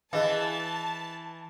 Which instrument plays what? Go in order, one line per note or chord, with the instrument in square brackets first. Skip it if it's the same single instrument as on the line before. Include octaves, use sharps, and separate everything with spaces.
[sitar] E3 [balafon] G#4 D#5 F5 [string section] A5